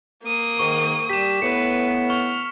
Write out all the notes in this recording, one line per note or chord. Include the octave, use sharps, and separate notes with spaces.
A#3 D#6
G#2 D#3 C#6
G3 G4 B6 E7
A2 B3 B4 C#7
C#6 F6